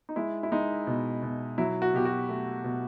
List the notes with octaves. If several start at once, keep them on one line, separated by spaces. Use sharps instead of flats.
D#4
G#3 E4
E4
G#3 D#4
B2
B2
F#3 E4
F#4
B2 G4
F#4
A3
B2